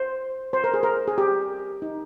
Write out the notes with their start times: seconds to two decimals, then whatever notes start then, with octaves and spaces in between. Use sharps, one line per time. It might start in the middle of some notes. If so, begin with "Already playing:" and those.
Already playing: C5
0.53 C5
0.64 A#4
0.74 G#4
0.83 A#4
1.08 G#4
1.18 G4
1.82 D#4